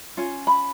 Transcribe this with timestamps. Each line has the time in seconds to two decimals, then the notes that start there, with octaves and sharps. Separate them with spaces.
0.17 C#4 F4
0.47 B5